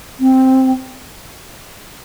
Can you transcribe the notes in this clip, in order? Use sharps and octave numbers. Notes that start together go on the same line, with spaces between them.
C4